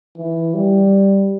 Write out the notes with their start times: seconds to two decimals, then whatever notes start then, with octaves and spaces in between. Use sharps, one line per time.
0.17 E3
0.54 G3